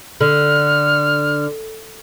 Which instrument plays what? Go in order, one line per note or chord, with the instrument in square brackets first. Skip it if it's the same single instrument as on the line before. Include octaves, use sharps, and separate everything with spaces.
[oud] D3 [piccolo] F6